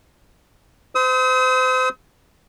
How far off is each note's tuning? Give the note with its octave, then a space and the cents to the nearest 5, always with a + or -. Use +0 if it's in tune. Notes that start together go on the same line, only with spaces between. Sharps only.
C5 -30 D#6 +45